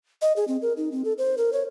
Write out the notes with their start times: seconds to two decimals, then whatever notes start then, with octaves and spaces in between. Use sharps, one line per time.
0.22 D#5
0.36 G#4
0.48 C4
0.62 A#4
0.77 D#4
0.92 C4
1.05 A4
1.18 C5
1.37 A#4
1.53 C#5